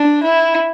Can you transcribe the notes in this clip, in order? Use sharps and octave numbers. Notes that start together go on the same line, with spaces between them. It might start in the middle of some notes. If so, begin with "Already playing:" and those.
Already playing: D4
E4